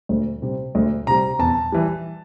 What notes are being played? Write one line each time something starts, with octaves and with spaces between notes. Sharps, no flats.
D2
C3 G3
D2
C3 G3 A#5
E2 A5
E3 G3